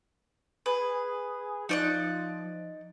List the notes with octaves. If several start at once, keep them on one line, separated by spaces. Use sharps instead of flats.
G#4 B4
F3 D#4 D5 F#6